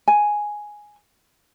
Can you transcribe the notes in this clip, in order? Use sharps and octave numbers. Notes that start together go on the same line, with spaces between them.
G#5